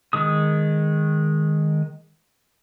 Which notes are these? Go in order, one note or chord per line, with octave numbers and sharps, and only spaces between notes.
D#3 G#3 D#6